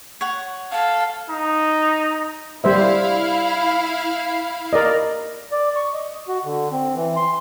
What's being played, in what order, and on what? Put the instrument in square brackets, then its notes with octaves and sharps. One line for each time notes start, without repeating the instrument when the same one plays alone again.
[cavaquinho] C#5 F#5
[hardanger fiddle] A4 [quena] F5
[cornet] D#4
[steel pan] G3 C5 E5 [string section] E4 F5
[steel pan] A#4 D5 D#5
[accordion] D5
C#6
D#5
F#4
D3
C4
E3
C6